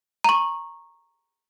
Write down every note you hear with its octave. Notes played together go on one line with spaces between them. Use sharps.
A#5 C#6